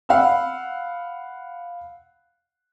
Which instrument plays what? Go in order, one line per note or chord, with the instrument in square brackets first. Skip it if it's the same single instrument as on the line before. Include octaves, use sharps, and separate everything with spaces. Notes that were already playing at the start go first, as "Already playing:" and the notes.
[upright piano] F5 F#5 B5 E6